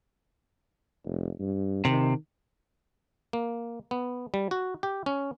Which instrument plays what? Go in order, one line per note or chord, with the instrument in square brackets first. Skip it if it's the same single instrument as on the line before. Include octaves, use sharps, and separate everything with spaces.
[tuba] F1
G2
[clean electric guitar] C3 [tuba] D#3
[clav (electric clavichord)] A#3
B3
G3
F#4
G4
C#4